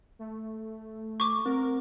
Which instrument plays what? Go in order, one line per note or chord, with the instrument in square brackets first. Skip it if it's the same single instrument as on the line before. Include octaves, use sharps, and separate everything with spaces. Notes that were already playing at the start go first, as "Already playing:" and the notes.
[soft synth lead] A3
[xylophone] C#6 D6
[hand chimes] C4 [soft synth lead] A#4